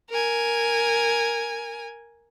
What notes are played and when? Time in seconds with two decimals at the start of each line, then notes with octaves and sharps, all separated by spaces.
0.10 A#4 G#5